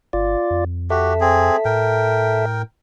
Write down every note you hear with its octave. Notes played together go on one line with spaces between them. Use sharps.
G1 F4 D5
F2
F#4 G4 A4 E5
C4 G#4
A2 A#4 G5